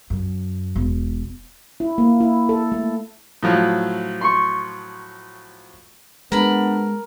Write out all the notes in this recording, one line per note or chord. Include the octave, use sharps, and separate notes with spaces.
F#2
E1
E4
A#3
E4
A4
A3
A2 F3 F#3
C6 C#6
G#3 B3 D4 A#4 B5